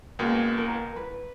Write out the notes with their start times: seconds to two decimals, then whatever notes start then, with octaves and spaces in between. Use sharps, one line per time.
0.19 C#2 B2 A#3 G#4
0.58 A#4
0.96 B4